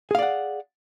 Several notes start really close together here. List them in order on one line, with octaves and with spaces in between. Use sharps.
G#4 F5 D5 F#5